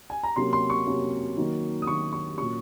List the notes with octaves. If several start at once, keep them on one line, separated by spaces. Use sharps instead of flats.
G#5
A#5
C3 F#3 A#3 C#4 C6
C6
C#6
C3 F#3 A#3 C#4
D#3 F#3 A#3 D#4
D#6
D#3 F#3 A#3 D#4 C#6
C#6
A#2 F#3 A#3 C#4 C#6